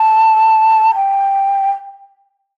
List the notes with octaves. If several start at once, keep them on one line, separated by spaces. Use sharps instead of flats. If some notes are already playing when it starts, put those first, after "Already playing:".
Already playing: A5
G5